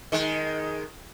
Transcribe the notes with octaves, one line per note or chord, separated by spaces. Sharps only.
D#3 G#3